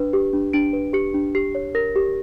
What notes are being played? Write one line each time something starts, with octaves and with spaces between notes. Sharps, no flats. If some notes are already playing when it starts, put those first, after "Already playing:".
Already playing: D4 B4
G4
D4
D4 D7
B4
G4 C#7
D4
G4 C7
C#5
A#4 A#6
G4